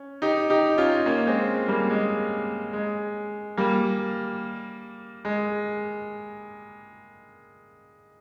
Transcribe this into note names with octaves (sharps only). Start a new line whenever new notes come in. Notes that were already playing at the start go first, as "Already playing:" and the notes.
Already playing: C#4
D#4 G4
D#4 G4
C#4 F4
A#3 C#4
G#3 C4
G3 A#3
G#3
G#3
G3 A#3
G#3